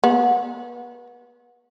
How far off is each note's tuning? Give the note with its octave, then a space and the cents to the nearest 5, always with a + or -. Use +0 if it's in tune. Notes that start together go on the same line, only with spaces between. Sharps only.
B3 -30